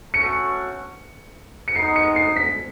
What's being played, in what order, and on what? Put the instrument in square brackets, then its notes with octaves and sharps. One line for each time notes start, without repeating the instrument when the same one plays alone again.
[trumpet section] A3 C#4 F#4 [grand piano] C#7
[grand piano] C#7
[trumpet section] G#3 B3 D#4 [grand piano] C7
[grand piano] C#7
C7
B6